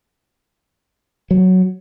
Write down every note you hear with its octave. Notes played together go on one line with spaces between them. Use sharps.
F#3